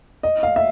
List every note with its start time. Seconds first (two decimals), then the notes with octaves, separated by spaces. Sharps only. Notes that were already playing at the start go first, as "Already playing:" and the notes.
0.23 D#5
0.43 F5
0.56 E5